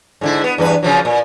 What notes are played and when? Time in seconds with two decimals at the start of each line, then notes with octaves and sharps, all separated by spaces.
0.21 G#2 D3 E4
0.44 B3
0.58 E2 G2 B4
0.83 C#3 F3 F#3
1.05 A#2